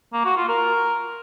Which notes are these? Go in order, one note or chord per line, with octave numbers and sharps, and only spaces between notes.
A#3
F#4
F4
A#4